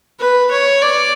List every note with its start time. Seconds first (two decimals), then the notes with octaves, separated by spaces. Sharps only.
0.20 B4
0.51 C#5
0.82 D5